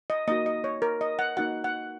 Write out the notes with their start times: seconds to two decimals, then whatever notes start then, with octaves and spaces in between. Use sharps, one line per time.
0.10 D#5
0.28 A#3 D#4 F#4 D#5
0.46 D#5
0.64 C#5
0.82 A#4
1.01 D#5
1.19 F#5
1.37 A#3 D#4 F#4 F#5
1.64 F#5